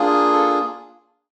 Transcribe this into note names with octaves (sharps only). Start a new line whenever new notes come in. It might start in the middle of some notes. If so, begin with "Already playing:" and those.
Already playing: A#3 D4 F4 G#4
A4